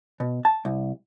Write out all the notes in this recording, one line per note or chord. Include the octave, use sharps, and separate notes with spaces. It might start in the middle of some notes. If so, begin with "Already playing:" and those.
B2
A5
C2